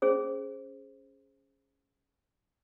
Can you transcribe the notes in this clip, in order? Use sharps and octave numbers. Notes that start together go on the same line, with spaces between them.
C#4 G#4 C5